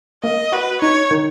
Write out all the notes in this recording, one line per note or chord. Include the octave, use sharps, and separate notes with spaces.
A#3 D#5
F#4 B4
D#4 C#5
D#3